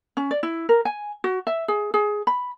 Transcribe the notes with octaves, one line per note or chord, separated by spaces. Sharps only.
C#4
D5
E4
A#4
G#5
F#4
E5
G#4
G#4
B5